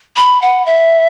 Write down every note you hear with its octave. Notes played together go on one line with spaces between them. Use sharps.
B5
F#5
E5